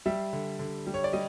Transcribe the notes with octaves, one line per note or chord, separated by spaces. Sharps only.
G3 E5
D3
D3
G3
C#5
D5
G3 D#5